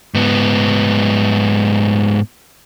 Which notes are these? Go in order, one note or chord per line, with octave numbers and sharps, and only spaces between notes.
G#2 B3